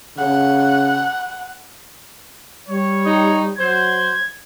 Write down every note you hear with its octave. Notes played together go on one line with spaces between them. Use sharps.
C#3 F#5
G3 C#5
D#4
F#3 C5 G#6